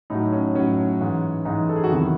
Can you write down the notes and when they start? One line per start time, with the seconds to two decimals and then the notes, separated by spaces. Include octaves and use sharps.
0.10 A2 F#3 D#4
0.33 C#4
0.55 A2 F#3 C#4
1.00 G#2 E3
1.45 G#2 E3 D#4
1.69 A4
1.76 G#4
1.84 F#4
1.90 E2 C3 D#3 F#3 E4